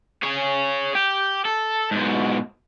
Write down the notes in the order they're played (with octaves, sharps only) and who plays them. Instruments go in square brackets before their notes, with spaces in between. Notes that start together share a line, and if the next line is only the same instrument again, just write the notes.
[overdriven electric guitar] G#4 C#5
G4
A4
G#2 B2